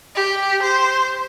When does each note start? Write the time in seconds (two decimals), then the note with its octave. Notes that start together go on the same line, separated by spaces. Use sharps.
0.15 G4
0.62 C5